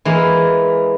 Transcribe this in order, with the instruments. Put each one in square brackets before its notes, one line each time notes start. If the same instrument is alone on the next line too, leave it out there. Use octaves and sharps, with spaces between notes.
[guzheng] E3 G#3 A#3